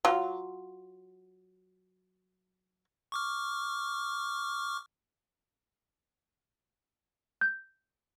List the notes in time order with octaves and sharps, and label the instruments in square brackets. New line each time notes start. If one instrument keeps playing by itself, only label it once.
[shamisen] F#3 F4
[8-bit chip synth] C#6 D6 F6
[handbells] G6